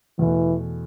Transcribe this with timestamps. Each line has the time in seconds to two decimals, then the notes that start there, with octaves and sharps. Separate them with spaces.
0.19 E2 B2 E3 A3